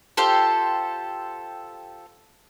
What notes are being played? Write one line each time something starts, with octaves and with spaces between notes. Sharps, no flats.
F4 G4 A4 C5